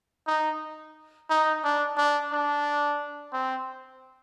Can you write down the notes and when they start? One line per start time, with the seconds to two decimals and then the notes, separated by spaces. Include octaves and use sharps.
0.27 D#4
1.30 D#4
1.64 D4
1.97 D4
2.32 D4
3.33 C4